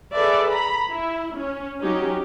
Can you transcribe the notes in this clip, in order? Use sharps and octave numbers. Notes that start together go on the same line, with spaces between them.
G#4 A4 B4 D5 E5
A#5 B5
E4
C#4
F#3 C#4 D#4 G4